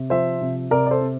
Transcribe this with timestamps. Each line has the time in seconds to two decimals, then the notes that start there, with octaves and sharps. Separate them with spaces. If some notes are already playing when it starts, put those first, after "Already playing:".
Already playing: C3
0.10 F3 C5 E5
0.42 C3
0.71 C3 A#4 D5
0.86 D5
0.91 A4 C5
1.01 C4